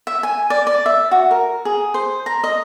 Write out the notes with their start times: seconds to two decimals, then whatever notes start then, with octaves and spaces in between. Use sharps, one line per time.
0.07 E5
0.23 G#5
0.50 D5
0.67 D5
0.86 E5
1.11 F#4
1.31 A#4
1.65 G#4
1.94 C5
2.26 A#5
2.44 D#5